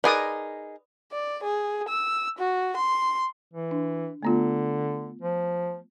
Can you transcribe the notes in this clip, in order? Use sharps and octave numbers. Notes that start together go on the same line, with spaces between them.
D#4 G#4 A#4 B4 D5 D#6
D5
G#4
E6
F#4
C6
E3
D4
D3 A3 B3 F4
F3